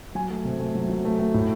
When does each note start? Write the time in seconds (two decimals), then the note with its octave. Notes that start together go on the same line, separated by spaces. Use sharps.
0.15 F#3 G#5
0.30 A3
0.45 C3
0.60 A3
0.75 F#3
0.90 F#3
1.05 A3
1.20 A3
1.34 A2